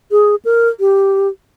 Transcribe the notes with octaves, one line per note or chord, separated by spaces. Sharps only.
G#4
A#4
G4